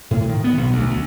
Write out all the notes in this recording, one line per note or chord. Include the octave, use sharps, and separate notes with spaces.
A2
D#3
B3
B1
D2
D2